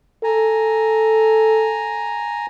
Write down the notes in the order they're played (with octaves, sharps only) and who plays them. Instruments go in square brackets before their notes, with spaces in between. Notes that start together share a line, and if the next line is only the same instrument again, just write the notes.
[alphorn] A4 [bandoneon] G#5 A#5